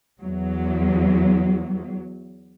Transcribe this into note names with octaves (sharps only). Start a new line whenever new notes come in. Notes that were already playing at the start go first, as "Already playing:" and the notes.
E2 F#3